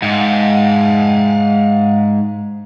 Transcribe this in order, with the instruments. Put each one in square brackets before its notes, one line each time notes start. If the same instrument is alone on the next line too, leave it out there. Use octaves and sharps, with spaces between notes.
[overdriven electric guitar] G#2 [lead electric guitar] F5 F#5